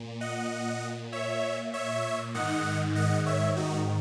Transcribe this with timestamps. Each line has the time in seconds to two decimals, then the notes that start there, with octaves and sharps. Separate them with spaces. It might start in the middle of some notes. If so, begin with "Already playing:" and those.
Already playing: A#2
0.21 D#5 F#5
1.12 C#5 E5
1.73 C#5 E5
2.34 G#2 D#3 D#5 F#5
2.95 D#5 F#5
3.26 C#5 E5
3.56 D#4 F#4